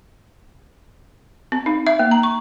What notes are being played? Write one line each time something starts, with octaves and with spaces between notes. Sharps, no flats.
C4
D#4
E5
A#3
A#5
C#6